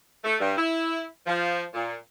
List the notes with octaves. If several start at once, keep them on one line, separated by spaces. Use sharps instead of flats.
A3
G2
E4
F3
A#2